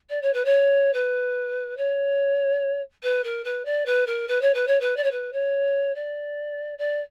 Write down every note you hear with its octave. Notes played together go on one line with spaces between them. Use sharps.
D5
C#5
B4
C#5
B4
C#5
B4
A#4
B4
D5
B4
A#4
B4
C#5
B4
C#5
B4
D5
C#5
B4
C#5
D5
D5